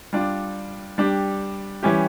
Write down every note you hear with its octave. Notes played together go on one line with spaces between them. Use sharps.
G3 D4 F4
G3 D4 G4
E3 G3 C#4 G4